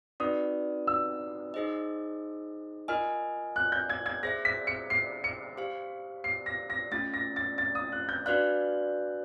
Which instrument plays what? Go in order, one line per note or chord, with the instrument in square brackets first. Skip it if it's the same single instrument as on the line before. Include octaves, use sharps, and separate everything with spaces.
[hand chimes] C4 D#4 F#4 B4 D5 [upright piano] D#6
[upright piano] E6
[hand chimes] D#4 G#4 C5 D#5
[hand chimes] F4 A#4 D#5 G#5 [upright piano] F6
[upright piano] F#6
G6
G#6
G#6
[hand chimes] G#4 C5 E5 [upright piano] A#6
[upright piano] B6
C#7
C7
C#7
[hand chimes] G4 C5 F5
[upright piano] C7
A#6
A#6
[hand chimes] A3 C#4 F4 [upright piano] A6
[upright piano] A#6
A6
A6
D#6
F#6
G6
[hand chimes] D4 F#4 B4 D5 F5 [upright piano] F#6